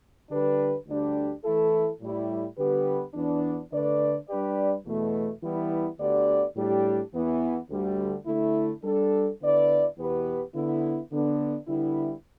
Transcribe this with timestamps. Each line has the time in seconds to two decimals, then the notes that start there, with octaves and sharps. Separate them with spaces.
0.31 D3 G3 D4 G4 B4
0.87 D2 D3 G3 D4 G4
1.44 E3 A3 E4 A4
2.01 A2 G3 E4
2.58 D3 G3 B3 G4 B4
3.14 E2 E3 B3 D4
3.72 D3 A3 D4 B4 D5
4.28 G3 D4 G4 B4 D5
4.85 E2 B2 A3
5.43 E3 G3 B3 E4
5.99 D2 D3 B3 G4 D5
6.56 A2 G3 D4 G4
7.13 E2 E3 B3
7.70 D2 D3 G3
8.27 D3 A3 E4
8.84 G3 D4 A4
9.41 D3 B3 E4 B4 D5
9.97 E2 B2 B3 G4 B4
10.55 D3 B3 E4
11.12 D3 B3 D4
11.68 D3 G3 B3 E4